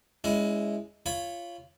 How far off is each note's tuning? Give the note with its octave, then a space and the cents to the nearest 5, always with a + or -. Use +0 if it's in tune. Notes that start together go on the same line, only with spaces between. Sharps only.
G#3 -5 C#4 +30 E4 +0
F4 -15 C#5 +0 B5 +5